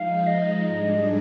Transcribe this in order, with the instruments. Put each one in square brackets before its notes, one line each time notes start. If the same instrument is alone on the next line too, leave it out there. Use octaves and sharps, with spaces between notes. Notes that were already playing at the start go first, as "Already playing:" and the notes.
Already playing: [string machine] F3 G#3 D#4 [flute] F5
[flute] D#5
[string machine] G#2 G3 D4 G#4